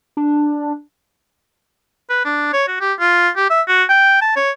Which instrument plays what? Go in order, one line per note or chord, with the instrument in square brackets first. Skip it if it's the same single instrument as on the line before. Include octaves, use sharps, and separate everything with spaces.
[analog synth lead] D4
[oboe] B4
D4
C#5
F#4
G4
F4
G4
E5
F#4
G5
A5
C#5